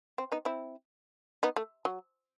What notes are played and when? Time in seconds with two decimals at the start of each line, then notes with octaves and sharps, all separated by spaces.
0.18 C4
0.32 B3 D#4
0.45 C4 E4
1.43 B3 D#4
1.56 A3
1.85 F#3